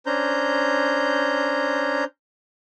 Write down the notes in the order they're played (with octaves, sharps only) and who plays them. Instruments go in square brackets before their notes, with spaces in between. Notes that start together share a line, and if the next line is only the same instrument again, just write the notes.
[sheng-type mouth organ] C#4 D4 C5 A#5 G6